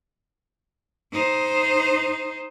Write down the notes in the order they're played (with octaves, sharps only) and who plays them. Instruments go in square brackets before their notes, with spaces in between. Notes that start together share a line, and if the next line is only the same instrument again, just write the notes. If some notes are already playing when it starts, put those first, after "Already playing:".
[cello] D#4 C5